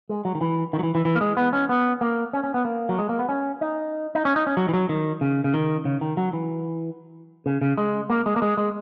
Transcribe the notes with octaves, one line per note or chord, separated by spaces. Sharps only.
G#3
F#3
D#3
E3
D#3
F#3
E3
E3
E3
A#3
G#3
B3
C#4
B3
A#3
C#4
C#4
B3
A#3
F#3
G#3
A#3
B3
C#4
D#4
D#4
C#4
D#4
C#4
F#3
E3
F#3
D#3
C#3
C#3
D#3
C#3
D#3
F#3
E3
C#3
C#3
G#3
A#3
G#3
A#3
G#3
G#3